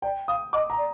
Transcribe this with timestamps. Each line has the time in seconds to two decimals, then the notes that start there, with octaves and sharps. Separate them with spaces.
0.02 D5 G5
0.28 F5 D#6
0.53 D#5 D6
0.70 A#5
0.78 D5